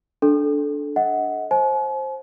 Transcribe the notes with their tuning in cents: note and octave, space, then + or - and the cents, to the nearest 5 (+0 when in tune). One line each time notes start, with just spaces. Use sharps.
D4 -5 A4 -15
D#5 +35 F#5 +0
C5 +15 G#5 +45